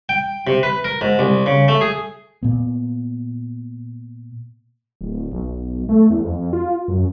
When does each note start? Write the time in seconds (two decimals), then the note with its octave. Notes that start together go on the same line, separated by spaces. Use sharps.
0.09 G5
0.47 C3
0.63 B4
0.84 A#4
1.01 G#2
1.19 C2
1.46 C#3
1.68 A3
1.81 G#4
2.43 A#2 B3
5.01 D1
5.32 B1
5.89 A3
6.10 E2
6.24 F2
6.53 F4
6.88 F#2